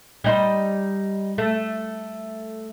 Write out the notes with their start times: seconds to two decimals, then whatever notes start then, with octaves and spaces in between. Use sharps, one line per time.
0.24 G3 D#4 C5
1.38 A3